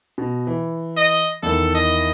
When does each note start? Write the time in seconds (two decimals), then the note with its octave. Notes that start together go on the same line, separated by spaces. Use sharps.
0.18 B2
0.47 E3
0.97 D#5
1.43 E2 D#3 A4
1.75 D#5